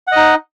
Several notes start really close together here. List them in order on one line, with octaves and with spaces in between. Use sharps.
F#5 D#5 D#4